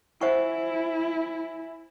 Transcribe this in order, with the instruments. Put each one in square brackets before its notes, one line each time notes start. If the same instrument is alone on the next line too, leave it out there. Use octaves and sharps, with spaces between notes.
[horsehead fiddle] E4 [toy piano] C5 F#5 C#6 [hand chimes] E5 G#5